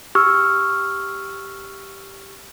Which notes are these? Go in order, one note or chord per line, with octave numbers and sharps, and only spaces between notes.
G4 C#6 E6 F6